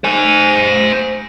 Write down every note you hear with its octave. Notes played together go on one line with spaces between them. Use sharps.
C5 G#5